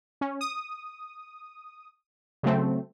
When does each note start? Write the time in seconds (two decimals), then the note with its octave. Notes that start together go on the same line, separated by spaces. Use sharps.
0.21 C#4
0.41 D#6
2.43 C#3 F#3 A3 C4